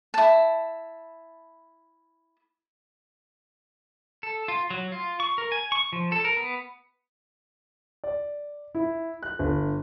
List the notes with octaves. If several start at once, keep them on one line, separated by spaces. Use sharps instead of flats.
E4 A5
A4
F4
F#3
F4
C#6
A#4
G#5
C#6
F3
A4
A#4
B3
D5
E4
F#6
G1